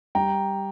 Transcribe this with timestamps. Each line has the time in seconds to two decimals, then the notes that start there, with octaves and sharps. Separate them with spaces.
0.15 G3 G5 A#5